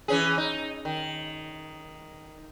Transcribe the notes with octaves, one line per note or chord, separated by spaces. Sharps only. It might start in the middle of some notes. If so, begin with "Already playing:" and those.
E3 C#4 G#4
D#4
D#3